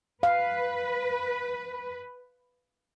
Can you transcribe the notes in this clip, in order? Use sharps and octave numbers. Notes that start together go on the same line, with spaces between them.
B4 F5